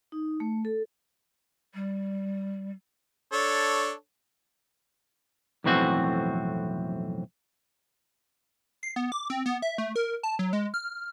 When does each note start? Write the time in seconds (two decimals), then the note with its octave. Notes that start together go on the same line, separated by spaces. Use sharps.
0.12 D#4
0.40 A3
0.65 A4
1.74 G3
3.32 D4 A4 C#5
5.64 B1 F2 A2 E3 C4 F#4
8.83 C7
8.96 B3
9.12 D6
9.30 C4
9.46 B3
9.62 E5
9.78 A3
9.96 A#4
10.23 A5
10.39 F#3
10.53 G#3
10.74 F6